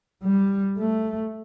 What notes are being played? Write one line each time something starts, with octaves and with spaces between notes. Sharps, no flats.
G3
A3